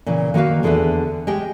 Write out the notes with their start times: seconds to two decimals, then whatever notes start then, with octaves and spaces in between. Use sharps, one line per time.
0.06 A#2 C#3 E3
0.34 D#3 A#3 F#4 B4 F5
0.63 E2 D3 G#4 B4 E5
1.27 G#3 G4 G5